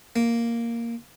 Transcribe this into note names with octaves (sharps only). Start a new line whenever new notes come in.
A#3